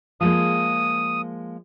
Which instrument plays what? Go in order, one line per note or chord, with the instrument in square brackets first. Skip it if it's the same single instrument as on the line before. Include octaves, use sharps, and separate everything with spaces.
[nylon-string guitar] F3 G#3 A#3 [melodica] D#6